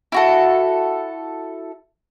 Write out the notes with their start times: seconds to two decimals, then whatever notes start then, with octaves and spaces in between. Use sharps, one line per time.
0.12 E4 F#4 A4